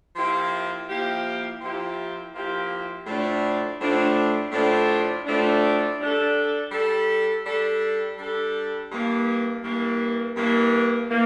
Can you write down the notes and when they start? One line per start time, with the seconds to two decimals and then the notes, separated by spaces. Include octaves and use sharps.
0.15 F3 A#3 E4 G4
0.88 F3 A#3 E4 G4
1.61 F3 A#3 E4 G4
2.34 F3 A#3 E4 G4
3.06 A2 F3 A3 D4
3.80 A2 F3 A3 D4
4.52 A2 F3 A3 D4
5.26 A2 F3 A3 D4
5.99 G3 D4 A4
6.71 G3 D4 A4
7.44 G3 D4 A4
8.18 G3 D4 A4
8.91 G2 E3 A#3
9.64 G2 E3 A#3
10.36 G2 E3 A#3
11.10 E3 A#3